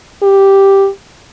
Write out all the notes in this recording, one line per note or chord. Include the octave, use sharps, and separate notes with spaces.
G4